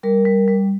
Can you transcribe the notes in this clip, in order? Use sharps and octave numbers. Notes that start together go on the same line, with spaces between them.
G3 A#4
G3
G3